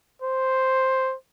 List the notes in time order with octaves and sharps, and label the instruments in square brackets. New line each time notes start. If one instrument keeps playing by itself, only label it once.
[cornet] C5